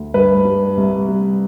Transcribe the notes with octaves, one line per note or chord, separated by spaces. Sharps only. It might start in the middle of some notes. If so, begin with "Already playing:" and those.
Already playing: D2
G2 B4
G3
C2
G3